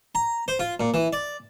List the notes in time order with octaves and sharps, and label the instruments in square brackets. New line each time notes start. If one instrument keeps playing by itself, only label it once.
[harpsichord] A#5
C5
F4
A#2
E3
D5